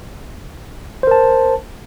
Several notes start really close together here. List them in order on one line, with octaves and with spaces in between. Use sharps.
C5 A#4 A5